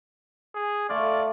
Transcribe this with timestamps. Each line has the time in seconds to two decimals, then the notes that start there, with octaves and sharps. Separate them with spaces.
0.55 G#4
0.89 A3 F4 D5